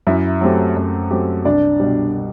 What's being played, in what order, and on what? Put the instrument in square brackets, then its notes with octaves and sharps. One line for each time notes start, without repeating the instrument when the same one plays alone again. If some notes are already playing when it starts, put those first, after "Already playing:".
[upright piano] F#2 [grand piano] E4 E5
[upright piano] F#3 A3 C4 G4
F#2
F#3 A3 C4 G4
[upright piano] C2 [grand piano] D4 D5
[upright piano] B2 G3